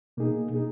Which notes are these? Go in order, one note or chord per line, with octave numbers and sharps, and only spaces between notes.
B2 A#3 D#4 G#4
D#4 G#4